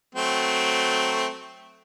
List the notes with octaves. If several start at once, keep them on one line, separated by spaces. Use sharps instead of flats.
F#3 A3 C4